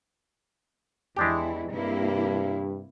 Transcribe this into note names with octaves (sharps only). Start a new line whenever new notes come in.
E2 E3 G#3 D4 E4 G4
G2 C3 A#3 E4